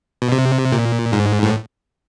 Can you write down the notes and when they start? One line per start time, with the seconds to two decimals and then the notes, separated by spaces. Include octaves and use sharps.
0.22 B2
0.32 C3
0.72 A#2
1.13 G#2
1.43 A2